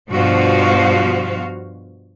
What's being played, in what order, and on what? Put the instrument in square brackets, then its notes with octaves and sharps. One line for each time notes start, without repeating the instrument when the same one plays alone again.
[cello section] G2 B2 F3 F#4 C5 F5